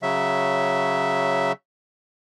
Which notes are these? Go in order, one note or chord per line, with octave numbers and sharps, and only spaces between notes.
C#3 F#3 E5